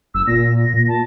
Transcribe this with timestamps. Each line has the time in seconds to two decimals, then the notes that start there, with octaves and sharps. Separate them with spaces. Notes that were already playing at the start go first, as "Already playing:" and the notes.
0.14 F#1 E6
0.27 A#2 A#6
0.74 A#2
0.88 A5